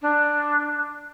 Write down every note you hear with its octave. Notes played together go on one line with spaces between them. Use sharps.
D4